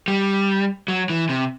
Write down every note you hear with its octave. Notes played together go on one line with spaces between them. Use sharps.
G3
F#3
E3
C3